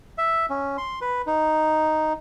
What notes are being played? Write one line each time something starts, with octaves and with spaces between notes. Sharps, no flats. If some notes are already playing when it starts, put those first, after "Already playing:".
E5
C#4
C6
B4
D#4